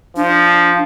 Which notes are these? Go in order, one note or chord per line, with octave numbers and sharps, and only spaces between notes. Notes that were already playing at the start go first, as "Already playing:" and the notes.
F3 D4